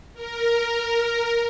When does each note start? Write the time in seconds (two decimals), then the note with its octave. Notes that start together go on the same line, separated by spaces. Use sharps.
0.14 A#4